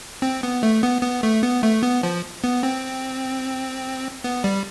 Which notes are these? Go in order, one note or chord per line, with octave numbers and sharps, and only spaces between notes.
C4
B3
A3
B3
B3
A3
B3
A3
B3
F3
B3
C4
B3
G3